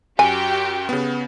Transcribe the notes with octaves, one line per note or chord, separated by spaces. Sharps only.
F#2 F#4 G4 G5 G#5
C#3 B3